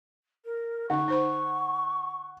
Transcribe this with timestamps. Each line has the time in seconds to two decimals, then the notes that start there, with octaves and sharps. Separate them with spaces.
0.45 A#4
0.90 D3 D#4 F#5 C#6
1.08 D#4 C5 B5